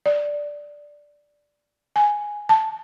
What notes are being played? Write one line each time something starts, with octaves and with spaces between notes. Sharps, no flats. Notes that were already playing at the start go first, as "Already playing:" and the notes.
D5
G#5
A5